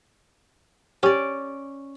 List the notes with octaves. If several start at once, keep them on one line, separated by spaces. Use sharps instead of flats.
C#4 G4 D5